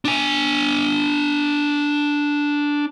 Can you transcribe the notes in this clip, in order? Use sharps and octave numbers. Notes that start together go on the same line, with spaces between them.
D4 G#5